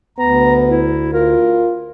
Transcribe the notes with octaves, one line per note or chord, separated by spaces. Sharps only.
D2 B3 A#5
E4
F4 A#4